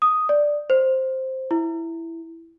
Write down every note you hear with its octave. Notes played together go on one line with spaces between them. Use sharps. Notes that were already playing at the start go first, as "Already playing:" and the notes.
D#6
D5
C5
E4